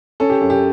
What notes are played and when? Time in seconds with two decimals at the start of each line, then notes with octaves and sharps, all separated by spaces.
0.20 C#4 A4
0.30 G4
0.41 F#2
0.50 G4